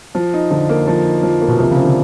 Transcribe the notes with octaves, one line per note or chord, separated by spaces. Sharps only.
F3
D#4
D3 F3
A#3
F3
D#4
F3
A#3
B2
C3 F3
C#3
C4
D3